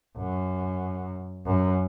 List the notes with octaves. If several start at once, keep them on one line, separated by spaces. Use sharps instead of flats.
F#2
F#2